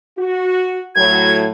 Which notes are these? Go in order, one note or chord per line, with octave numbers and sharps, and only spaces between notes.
F#4
A2 F#3 G#6